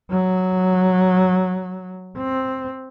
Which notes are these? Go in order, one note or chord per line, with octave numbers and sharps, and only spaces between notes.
F#3
C4